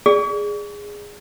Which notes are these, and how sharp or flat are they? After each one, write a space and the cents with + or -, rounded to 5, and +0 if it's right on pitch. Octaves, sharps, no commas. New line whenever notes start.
G#4 -10 D5 +0